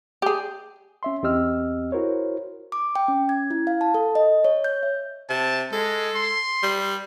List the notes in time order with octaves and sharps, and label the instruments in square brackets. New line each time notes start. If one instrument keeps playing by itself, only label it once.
[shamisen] G4 G#4
[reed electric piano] C#4 E5 C6
E2 C4 G4 D#5 E6 F6
E4 F#4 A#4 C5 C#5
[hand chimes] D6
G5
C#4
G#6
E4
F5
A5
A4
D#5
C#5
G6
E5
[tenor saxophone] C3 [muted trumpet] A5
[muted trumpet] G#3 [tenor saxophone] A4
[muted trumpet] C6
[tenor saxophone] G3